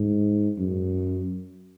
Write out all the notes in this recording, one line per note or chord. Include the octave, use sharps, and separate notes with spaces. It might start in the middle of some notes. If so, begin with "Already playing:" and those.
Already playing: G#2
F#2